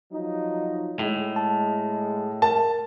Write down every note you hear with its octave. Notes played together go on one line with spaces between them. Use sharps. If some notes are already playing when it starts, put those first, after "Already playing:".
F3 F#3 D#4
A2 G#3
A5
A#4 A5